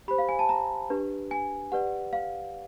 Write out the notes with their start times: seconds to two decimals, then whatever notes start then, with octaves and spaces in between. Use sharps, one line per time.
0.08 G4 B5
0.11 C5
0.18 F5
0.29 G#5
0.39 A5
0.49 A#5
0.90 D4 G4 B4
1.31 G#5
1.72 G4 B4 D5 F#5
2.13 F5